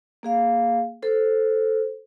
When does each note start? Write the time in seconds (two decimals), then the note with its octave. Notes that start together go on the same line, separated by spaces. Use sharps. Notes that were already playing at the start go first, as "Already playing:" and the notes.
0.23 A#3 G#4 F5
1.03 A4 C5